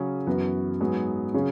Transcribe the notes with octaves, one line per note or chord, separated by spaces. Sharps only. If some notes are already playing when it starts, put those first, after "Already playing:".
Already playing: C#3 F#3 C#4 G#4
F#2 E3 B3 F#4
G#2 F#3 B3 G#4
C#3 F#3 C#4 G#4